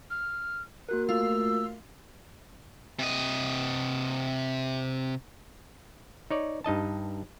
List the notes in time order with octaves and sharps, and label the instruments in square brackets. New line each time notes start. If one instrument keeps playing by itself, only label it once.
[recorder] F6
[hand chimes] A#3 F#4 A#4 [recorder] F#6
[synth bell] A3 F4 F5 [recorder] E6
[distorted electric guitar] C3 D#5
[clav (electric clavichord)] D#4 C#5 D5
G2 D#4 D#5 A5